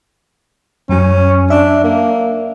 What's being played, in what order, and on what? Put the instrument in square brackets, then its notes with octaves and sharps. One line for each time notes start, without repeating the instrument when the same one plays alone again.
[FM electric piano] F#2 F#3 [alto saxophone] C#4
[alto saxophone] D4 [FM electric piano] E5
[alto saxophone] A#3